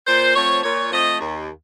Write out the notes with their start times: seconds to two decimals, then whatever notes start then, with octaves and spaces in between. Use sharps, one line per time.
0.07 A#2 C5
0.36 F3 A3 C4 C#5
0.64 A#2 C#5
0.92 F3 A3 C4 D#5
1.21 D#2